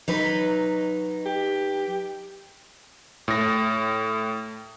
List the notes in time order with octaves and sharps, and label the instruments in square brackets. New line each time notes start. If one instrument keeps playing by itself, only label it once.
[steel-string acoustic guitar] F#3 D#4 B4
[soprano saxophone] G4
[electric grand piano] A2 A#6